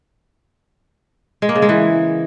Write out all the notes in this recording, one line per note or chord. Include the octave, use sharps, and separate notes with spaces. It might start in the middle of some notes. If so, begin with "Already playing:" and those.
G#3
A#3
C#3
G#3
E3